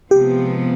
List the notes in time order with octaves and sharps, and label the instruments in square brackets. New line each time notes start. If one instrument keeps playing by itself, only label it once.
[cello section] C3 F3 G#3 B3 [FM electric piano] G4